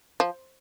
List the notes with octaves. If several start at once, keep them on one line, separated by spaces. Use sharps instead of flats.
F3